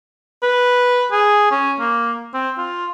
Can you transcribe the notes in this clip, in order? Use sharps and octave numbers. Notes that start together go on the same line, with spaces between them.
B4
G#4
C#4
A#3
C4
F4